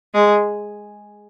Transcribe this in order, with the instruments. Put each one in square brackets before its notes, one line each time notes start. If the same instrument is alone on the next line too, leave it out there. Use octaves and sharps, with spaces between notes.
[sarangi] G#3